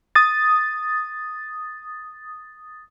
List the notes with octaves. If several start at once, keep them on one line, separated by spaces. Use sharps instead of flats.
D#6 A6